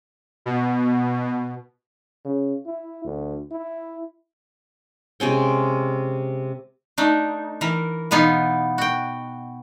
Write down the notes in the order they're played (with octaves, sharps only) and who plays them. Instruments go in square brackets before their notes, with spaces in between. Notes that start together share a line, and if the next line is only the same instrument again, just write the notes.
[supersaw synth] B2
[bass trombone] C#3
E4
D2
E4
[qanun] C3 G#3 C#4 G5
[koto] A3 D4 D#4
E3 A#4
B2 E3 B3 D#4 F4
F#4 G5